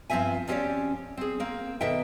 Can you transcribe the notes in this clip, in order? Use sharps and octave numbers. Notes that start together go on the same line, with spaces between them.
G2 F3 B3 C4 E5 G#5
F3 C4 C#4 G4 C#5 D5
C4 G#4
A#3 C4
B2 D#3 A4 E5 G5